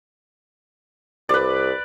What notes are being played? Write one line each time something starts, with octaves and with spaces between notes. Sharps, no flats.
C2 B4 D5